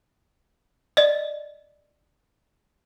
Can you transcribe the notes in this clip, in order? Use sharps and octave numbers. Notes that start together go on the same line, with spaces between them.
D5 D#5